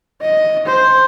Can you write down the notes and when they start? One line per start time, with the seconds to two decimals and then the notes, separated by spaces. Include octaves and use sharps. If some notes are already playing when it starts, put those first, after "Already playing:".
0.22 D#5
0.66 C5